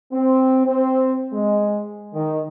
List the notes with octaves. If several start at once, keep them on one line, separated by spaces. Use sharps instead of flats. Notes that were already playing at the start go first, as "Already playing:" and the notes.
C4
C4
G#3
D#3